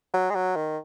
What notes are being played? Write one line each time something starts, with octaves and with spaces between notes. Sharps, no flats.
F#3
G#3
F#3
D#3